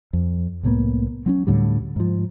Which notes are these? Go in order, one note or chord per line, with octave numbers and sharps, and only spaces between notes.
F2
C2 A2 A#3 B3
F#3 C4 C#4
D2 A2 D3 G3
G#2 F3